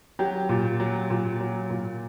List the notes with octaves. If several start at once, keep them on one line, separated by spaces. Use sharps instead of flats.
F#3 G4
A#2
F#3
A#2
F#3
A#2